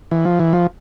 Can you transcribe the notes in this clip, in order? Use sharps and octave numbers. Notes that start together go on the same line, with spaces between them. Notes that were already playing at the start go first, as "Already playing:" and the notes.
E3
F3
E3
F3